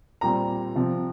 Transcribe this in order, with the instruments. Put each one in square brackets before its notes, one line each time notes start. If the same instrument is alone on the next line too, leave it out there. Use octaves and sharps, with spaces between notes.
[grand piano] A#2 G3 C4 A#5
C3 F3 C4